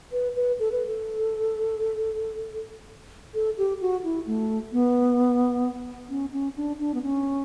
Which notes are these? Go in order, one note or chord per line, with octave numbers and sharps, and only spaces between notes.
B4
B4
A4
B4
A4
A4
G4
F#4
E4
A3
B3
C#4
C#4
D4
D4
B3
C#4